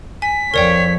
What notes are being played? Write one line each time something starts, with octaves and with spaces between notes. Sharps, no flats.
G#5 B6
F2 A#4 C#5 D5 G5